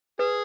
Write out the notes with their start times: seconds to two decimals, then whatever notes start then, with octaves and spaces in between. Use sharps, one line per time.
0.19 G#4 B4